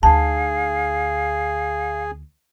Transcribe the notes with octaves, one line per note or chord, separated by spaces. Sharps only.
D2 D#4 G#4 F5 A5